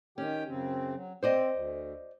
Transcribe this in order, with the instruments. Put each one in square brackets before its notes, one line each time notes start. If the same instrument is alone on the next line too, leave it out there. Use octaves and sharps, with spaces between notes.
[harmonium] D#3 G4 G5 [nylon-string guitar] C#4
[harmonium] F#2 C#3 C4
F#3
[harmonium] C4 [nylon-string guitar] C5 D5 D#5
[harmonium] D2